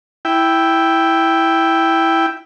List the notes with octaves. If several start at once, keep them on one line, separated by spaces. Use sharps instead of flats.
E4 G5